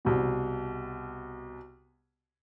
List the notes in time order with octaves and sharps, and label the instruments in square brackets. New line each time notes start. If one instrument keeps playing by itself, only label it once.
[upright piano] C2 B2